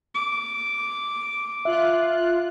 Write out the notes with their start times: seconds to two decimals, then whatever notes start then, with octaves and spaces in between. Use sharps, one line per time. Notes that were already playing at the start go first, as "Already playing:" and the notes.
0.14 D6
1.65 F4 E5 F#6